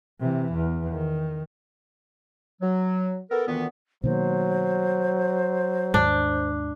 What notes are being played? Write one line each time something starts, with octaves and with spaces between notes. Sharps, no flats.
C3 E3
E2
D#3
F#3
B3 A4 A#4
D2 A#2 D#3 E3 B3
B2 D#3 F#3 A#3 C5
D#2 G#2 D4